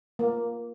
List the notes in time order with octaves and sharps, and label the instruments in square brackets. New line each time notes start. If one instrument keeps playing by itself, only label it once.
[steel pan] A#3